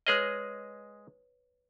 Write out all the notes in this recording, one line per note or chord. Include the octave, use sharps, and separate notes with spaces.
G#3 G#4 B4 C#5 D#5 F6